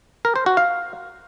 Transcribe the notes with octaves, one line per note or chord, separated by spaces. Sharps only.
A#4
C5
F#4
F5